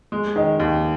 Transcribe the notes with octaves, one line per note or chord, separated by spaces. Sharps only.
G#3
D#3 D#5
D#2